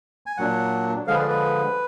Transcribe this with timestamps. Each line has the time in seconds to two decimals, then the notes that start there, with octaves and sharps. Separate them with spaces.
0.26 G#5
0.37 A#2 F#3 D4 F#5
1.07 D3 F3 G#3 F5
1.14 B4
1.19 D5
1.29 B4